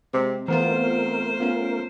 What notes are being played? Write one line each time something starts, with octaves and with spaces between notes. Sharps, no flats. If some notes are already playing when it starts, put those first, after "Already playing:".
C3 G#3 C4
E3 A3 B3 C4 F4 A#4 C5
B3 C#4 F4